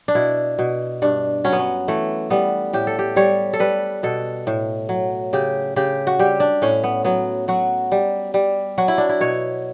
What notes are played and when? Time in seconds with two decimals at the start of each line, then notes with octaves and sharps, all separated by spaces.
0.08 D4
0.15 B2 E4
0.59 B2
1.02 G2 D4
1.44 F#3 C#4
1.52 B3
1.59 C#4
1.88 E3 A3
2.30 G3 B3
2.73 A2 G4
2.87 A4
2.99 G4
3.16 G3 C#5
3.53 A4
3.60 G3 B4
4.03 B2 A4
4.47 A2
4.89 F#3
5.33 C#3 G4
5.76 C#3 G4
6.07 F#4
6.19 G3 G4
6.40 D4
6.62 A2 C#4
6.84 B3
7.05 F#3 B3
7.48 F#3 F#4
7.92 G3
8.34 G3
8.78 F#3 F#4
8.88 E4
8.98 D4
9.09 E4
9.20 B2 C#5